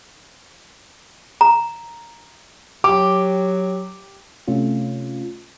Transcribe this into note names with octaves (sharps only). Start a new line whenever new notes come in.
A#5
F#3 G4 D6
C3 A3 C#4 F4